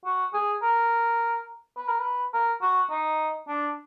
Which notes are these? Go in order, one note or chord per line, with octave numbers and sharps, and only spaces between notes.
F#4
G#4
A#4
B4
A#4
B4
A#4
F#4
D#4
D4